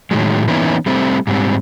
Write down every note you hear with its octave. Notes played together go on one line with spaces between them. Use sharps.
A2 D#3 F#3 G#3
E3 A#3 B3 C#4 D#4 E4
G3 A3 C4
G#2 G3 C4